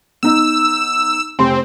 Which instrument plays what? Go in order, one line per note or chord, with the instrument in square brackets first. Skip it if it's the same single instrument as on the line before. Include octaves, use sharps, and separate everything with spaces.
[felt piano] B3 D#4 [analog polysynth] E6
[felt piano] F1 C6 [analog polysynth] C4